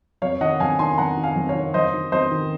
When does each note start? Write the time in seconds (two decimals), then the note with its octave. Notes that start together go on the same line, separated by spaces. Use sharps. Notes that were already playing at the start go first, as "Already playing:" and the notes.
0.22 F2 C#5 F5
0.41 D#3 D#5 F#5
0.60 F2 F5 G#5
0.79 D#3 G#5 C6
0.98 F2 F#5 A#5
1.17 D#3
1.23 F5 G#5
1.36 F2
1.49 C#5 F5
1.55 D#3
1.74 F2 C5 D#5
1.93 D#3
2.12 F2 C5 D#5
2.31 D#3